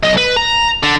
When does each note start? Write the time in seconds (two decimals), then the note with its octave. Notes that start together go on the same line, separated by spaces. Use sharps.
0.03 B1 D#5
0.17 B4
0.36 A#5
0.83 D3